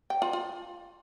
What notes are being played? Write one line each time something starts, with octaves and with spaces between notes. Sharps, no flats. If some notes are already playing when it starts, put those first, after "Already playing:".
G5
F4
F4